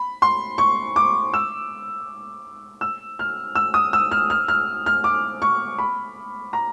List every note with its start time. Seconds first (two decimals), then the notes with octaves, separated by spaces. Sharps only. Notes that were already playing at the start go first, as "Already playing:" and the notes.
Already playing: B5
0.22 C6
0.58 C#6
0.96 D6
1.34 E6
2.81 E6
3.19 F6
3.55 E6
3.74 D#6
3.93 E6
4.11 F6
4.30 F6
4.48 F6
4.86 F6
5.04 D6
5.42 C#6
5.78 B5
6.53 A#5